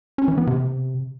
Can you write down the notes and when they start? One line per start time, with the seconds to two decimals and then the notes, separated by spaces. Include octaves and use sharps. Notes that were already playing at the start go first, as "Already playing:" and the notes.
0.18 C#4
0.28 E3
0.38 B3
0.47 C3